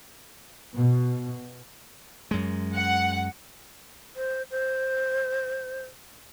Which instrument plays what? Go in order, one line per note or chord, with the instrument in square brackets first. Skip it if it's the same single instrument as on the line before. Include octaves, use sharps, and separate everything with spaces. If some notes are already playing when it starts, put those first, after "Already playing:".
[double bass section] B2
[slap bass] F#2 G#3
[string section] F#5
[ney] C5
C5